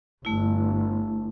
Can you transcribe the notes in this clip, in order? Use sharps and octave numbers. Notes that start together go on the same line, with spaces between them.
G1 A3 E4